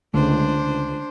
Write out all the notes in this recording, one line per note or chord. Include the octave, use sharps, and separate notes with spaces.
C#2 D3 A3 D4 C5